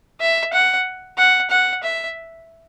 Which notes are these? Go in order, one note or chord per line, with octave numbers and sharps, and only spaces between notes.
E5
F#5
F#5
F#5
E5